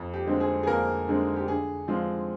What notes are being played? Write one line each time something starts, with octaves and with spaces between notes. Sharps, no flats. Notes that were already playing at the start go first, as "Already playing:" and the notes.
Already playing: F2
G4
D3 G#3 C4 D#4
G#4
G#4
F2 A#3 A#4
D3 G#3 C4 D#4
G4
D3 G#4
F3 G#3 C4 F4